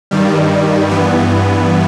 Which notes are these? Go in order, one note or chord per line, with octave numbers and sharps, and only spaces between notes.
G2 D#3 G3
G2 E3 B3